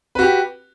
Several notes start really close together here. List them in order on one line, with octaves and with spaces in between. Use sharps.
B4 F#4 G4